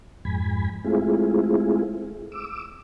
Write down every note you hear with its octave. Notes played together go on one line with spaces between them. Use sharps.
F2 G#2 G#5 B5
G#3 A3 C4 E4 F4 G#4
D6 E6